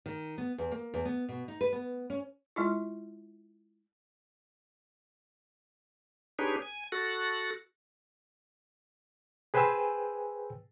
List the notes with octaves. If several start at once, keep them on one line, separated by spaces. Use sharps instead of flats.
D#3
B3
E2
A#3
E2
B3
B2
D#4
B4
B3
C#4
G#3 E4 F4
D4 D#4 G4 G#4 B4 C#5
G#5
F#4 A4 F#6
G#4 B4 C5 G5 G#5 E6